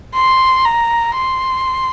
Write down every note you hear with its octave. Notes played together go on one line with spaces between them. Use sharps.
C6
A#5
C6